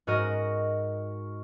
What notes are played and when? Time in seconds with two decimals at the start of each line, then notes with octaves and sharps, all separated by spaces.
0.07 G#2 F#4 A#4 D#5